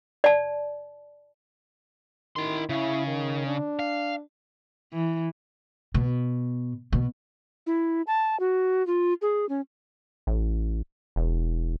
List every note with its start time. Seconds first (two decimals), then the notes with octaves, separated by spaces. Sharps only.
0.24 D5 A5
2.36 D#3 E4 C6
2.69 C#3 E4
3.07 D#3
3.46 D4
3.79 F5
4.93 E3
5.94 B2
6.93 B2
7.67 E4
8.07 A5
8.40 F#4
8.87 F4
9.22 G#4
9.49 C#4
10.27 A1
11.16 E1